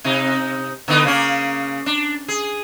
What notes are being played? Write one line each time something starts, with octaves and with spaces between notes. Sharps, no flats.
C3 D#4
D3 B3 D#4
C#3 A#3 C#4
D4
G#4